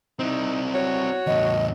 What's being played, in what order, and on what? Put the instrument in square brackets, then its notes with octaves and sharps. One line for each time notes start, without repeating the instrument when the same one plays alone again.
[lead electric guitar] C4 E4 [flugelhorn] D#4
[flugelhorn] F#4 [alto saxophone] C#5
[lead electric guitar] E2 A2 [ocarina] D#5